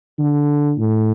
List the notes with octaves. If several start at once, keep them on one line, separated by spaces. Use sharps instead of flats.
D3
A2